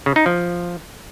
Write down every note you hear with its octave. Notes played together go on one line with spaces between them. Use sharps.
C#3
D#4
F3